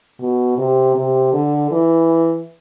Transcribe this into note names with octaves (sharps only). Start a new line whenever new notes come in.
B2
C3
C3
D3
E3